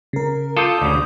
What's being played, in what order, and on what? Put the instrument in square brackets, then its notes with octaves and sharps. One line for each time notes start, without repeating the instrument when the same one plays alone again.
[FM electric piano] C#3 A#4
[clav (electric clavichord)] F4 A4 [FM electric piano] D6 D#6 G6
[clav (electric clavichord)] D2 C#3